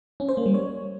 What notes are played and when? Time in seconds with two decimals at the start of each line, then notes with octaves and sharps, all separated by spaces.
0.20 C#4
0.29 C5
0.37 A#3
0.46 G3
0.54 C#5